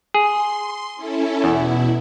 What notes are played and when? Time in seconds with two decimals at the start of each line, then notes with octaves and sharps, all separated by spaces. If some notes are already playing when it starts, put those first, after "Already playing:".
0.14 G#4 C6
0.96 C#4 E4 A4
1.44 E2 B2 E4